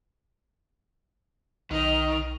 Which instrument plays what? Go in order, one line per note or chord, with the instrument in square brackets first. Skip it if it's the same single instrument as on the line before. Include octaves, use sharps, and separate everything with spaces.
[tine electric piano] B1 [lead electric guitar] D#3 [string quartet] D#5 F6